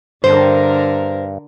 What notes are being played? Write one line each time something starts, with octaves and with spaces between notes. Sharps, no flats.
G2 D3 A#4 C5